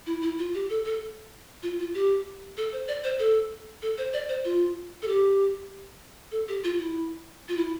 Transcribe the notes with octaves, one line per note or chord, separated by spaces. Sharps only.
E4
E4
F4
G4
A4
A4
F4
F4
G4
A4
C5
D5
C5
A4
A4
C5
D5
C5
F4
A4
G4
A4
G4
F4
E4
F4
E4